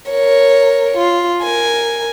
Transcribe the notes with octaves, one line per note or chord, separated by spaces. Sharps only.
A#4 C#5
F4
A#4 G#5